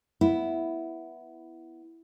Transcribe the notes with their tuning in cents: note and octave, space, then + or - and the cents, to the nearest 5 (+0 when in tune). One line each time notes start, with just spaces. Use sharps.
B3 +0 E4 +0